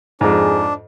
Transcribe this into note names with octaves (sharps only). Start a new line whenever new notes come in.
F2 G#2 D4 G#4